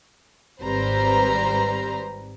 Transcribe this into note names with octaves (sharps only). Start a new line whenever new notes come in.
G#1 G3 C4 B4 C5 A#5